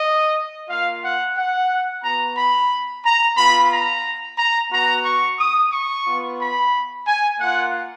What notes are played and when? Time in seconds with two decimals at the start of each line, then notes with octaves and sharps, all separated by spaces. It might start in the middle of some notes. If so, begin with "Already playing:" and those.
Already playing: D#5
0.68 A#3 F4 F5
1.03 F#5
1.37 F#5
2.03 B3 F#4 A#5
2.37 B5
3.04 A#5
3.37 B3 F4 B5
3.71 A#5
4.38 A#5
4.72 B3 F#4 A#5
5.05 C#6
5.38 D#6
5.72 C#6
6.06 B3 F4
6.40 B5
7.07 G#5
7.40 A#3 F4 F#5